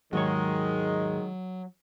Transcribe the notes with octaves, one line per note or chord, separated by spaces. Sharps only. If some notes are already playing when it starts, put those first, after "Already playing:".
D#2 G#2 D#3 F#3 G#3 C#5